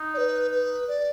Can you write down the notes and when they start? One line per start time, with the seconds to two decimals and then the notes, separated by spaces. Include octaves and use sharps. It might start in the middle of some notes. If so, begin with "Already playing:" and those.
Already playing: D#4
0.14 D5
0.18 B4
0.51 B4
0.88 D5